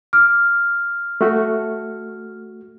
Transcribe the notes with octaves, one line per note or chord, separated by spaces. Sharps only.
D6 F6
A3 F#4